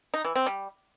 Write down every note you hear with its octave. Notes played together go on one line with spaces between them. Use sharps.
D#4
E3
C4
G3